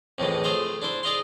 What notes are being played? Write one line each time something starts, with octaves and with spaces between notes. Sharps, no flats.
F2 A2 E3 G#3
A3 G#4 C5 F5
D4 E4 C5
G#4 D5 D#5 F5 C6